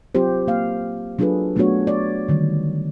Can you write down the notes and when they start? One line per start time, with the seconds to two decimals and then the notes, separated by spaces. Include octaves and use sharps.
0.15 F#3 C4 F4 G4 C5
0.47 A#3 F5
1.19 F#3 D4 F4 G#4 A4 B4
1.56 F#3 A3 B3 D4 F#4 C#5
1.87 C#5 D5
2.29 D3 D#3 F#3 G3